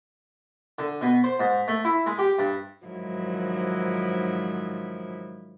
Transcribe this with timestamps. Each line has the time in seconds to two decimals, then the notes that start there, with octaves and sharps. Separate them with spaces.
0.79 D3
1.01 B2
1.24 C5
1.40 G#2
1.68 A3
1.85 E4
2.06 G#3
2.19 G4
2.39 G2
2.86 G#2 D#3 F3 F#3 E4